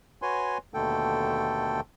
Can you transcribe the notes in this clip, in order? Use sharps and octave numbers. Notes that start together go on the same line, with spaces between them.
F#4 B4 C#5 G#5 C6
D#2 B2 D3 A3 A4 G5